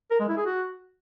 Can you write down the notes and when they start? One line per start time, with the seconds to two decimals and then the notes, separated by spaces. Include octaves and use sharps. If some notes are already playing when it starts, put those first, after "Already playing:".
0.11 A#4
0.20 G#3
0.29 E4
0.38 G#4
0.46 F#4